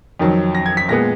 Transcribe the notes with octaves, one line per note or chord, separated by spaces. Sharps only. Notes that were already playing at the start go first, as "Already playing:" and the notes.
F2 D#3 F#3
A#6
G#6
B6
A#2 G#3 B3 A#6